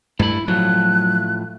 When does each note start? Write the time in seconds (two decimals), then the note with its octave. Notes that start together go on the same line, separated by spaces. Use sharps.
0.19 G2 A3 E4 B5
0.48 A2 F3 F#3 F#6